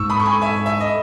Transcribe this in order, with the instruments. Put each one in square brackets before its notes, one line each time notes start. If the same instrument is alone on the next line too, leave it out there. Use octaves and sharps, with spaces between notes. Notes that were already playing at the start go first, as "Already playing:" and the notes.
Already playing: [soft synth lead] G#2 [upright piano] C#6 E6
[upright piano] B5 D#6
C#6
G#5 B5
E5 G#5
E5
D#5